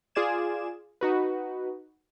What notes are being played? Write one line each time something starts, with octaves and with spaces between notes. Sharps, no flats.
F4 G#4 D5 D6 G#6 E7
D#4 F#4 B4